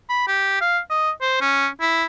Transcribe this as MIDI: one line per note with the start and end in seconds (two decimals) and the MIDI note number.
0.10 0.27 83
0.27 0.59 67
0.61 0.79 77
0.90 1.11 75
1.22 1.41 72
1.41 1.68 61
1.81 2.05 64